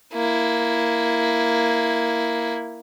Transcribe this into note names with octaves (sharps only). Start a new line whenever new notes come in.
A#3 E4